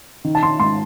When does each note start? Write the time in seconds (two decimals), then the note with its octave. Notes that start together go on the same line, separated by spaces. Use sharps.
0.24 D#3
0.35 A5
0.43 D#3 C6
0.60 G#2 C6